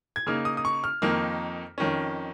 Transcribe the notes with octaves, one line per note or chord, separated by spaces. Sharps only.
G#6
C#3 A#3 D#4 F6
D#6
D#6
C#6
F6
F2 D#3 A#3 D#4
F2 D#3 C#4